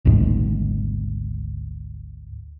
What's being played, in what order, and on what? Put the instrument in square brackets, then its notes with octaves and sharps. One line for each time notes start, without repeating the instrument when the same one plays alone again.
[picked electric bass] G#1 D2 G#2